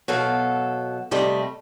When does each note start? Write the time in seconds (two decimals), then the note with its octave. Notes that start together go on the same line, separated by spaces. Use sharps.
0.08 B2 F#3 A4 F5
1.11 C3 G3 A3 D#5